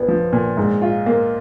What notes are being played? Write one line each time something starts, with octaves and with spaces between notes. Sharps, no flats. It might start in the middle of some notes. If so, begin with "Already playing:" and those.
Already playing: A#1 B3
F3
A#2
G#2
F4
A#3